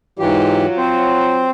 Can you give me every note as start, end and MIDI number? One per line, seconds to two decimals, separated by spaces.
0.19 0.66 44
0.19 0.66 52
0.19 1.52 54
0.19 1.52 65
0.19 0.66 67
0.77 1.51 60
0.77 1.51 72